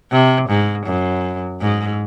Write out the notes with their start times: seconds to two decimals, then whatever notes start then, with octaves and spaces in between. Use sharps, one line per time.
0.12 C3
0.49 G#2
0.86 F#2
1.61 G#2